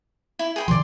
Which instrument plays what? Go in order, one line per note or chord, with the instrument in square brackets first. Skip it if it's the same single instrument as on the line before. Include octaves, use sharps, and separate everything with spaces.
[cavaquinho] E4
G#4 G5 B5
[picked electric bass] C3 D#3 F3 [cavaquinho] D5 C6